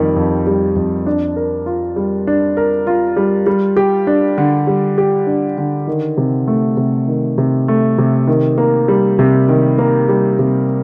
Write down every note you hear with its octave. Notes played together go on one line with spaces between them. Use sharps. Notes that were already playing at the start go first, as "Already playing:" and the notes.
Already playing: F2 D#3 G3
F2
G3
F2
D4
A#4
F4
G3
D4
A#4
F4
G3
G3
G4
D4
D3
G3
G4
D4
D3
D#3
C3
A3
C3
D#3
C3
A3
C3
D#3
A#3
G3
C3
D#3
A#3
G3
C3